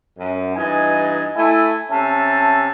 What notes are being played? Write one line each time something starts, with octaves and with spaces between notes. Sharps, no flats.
F#2
G2 E3 D#4 D#5 G#5
A3 E4 G#5
C3 C#4 E5 A5